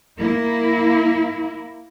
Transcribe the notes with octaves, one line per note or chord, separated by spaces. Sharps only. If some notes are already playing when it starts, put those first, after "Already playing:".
A#3 E4